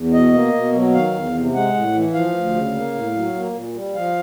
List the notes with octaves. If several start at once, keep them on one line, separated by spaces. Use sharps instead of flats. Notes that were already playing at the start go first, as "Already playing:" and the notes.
Already playing: E2
B2 D#5
A#3
B2
F#3
D#3 F5
E2
C3
G#3 F#5
A2
E3
F3 F5
D2
C#3
A#3
A2
F#3
A#3
A#2
G3
F3 F5